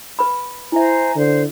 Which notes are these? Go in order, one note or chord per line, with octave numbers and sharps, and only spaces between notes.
B4 B5
E4 C5 E5 G#5 A#5
D3 C5